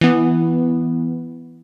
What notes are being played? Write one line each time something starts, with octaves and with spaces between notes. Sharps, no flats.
E3 B3